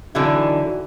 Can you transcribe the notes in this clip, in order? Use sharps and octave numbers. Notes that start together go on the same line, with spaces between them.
D3 E3 F#3 D#4 E4 F#4